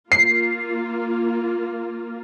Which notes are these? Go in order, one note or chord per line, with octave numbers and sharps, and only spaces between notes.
A#3 F4 C7